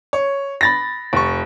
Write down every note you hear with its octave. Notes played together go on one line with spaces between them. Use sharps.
C#5
B5 A6 A#6
F1 C#6